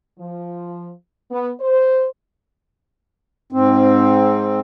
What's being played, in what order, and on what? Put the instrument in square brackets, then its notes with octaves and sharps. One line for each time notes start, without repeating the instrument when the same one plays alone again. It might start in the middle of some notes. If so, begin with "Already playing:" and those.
[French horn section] F3
B3
C5
[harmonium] G#2 C4